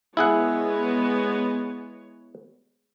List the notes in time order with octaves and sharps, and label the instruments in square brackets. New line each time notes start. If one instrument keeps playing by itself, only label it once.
[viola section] G#3 B3 C#5 [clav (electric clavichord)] E4 G#4 F#5